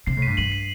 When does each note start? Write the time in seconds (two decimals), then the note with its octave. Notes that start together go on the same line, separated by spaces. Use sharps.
0.07 C3 C7
0.17 A2
0.22 G2 B6 D#7
0.37 G2 D#7 F#7
0.52 C7